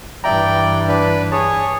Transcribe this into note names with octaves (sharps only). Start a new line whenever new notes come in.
G2 E3 D5 E5 G5 A#5
D4 B4
G#4 C#5 A5